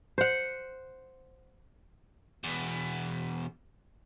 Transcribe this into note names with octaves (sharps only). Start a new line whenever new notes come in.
C5 F#5
E2 B2